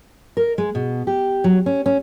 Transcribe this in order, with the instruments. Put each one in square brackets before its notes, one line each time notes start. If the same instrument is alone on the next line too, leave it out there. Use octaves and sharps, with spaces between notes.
[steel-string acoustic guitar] A#4
G#3
B2
G4
F#3
C#4
C#4